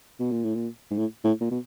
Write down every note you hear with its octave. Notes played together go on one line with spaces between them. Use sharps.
B2
A#2
A2
A#2
G#2
A2
A2
A#2
B2